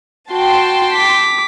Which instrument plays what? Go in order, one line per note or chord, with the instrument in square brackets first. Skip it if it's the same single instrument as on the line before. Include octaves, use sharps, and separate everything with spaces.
[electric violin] F#4 [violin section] G5 A5 C6
[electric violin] D6 B6